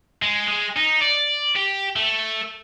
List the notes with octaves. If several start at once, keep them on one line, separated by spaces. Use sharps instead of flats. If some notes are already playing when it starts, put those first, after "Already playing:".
G#3
G#3
D#4
D5
G4
A3